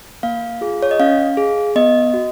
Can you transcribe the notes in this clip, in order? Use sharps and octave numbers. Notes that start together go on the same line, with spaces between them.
A#3 F5
F4 G#4
C#5
D#5
C#4 F5
G#4
B3 D#5
F#4